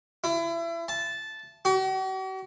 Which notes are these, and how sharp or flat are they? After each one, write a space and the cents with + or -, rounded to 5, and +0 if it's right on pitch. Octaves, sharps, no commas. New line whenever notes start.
E4 +30
A5 -10
F#4 +45